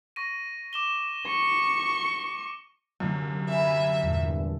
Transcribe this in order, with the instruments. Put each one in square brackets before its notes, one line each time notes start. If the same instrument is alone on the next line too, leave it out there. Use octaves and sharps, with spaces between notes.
[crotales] C#6 A#6 D#7
D6 E7 G7
[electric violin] C#6
[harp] C2 D3 A#3 [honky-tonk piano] F#2
[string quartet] E5 [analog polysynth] G#5 B5
[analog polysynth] E2 G2 [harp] A#2 G#3 A3